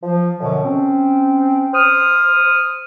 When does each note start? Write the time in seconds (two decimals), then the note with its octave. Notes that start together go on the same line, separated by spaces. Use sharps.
0.03 F3
0.39 F#2 B2 D3 F3
0.64 C4 C#4
1.74 C5 D#6 F6